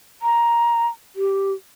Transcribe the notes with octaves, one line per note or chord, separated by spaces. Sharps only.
A#5
G4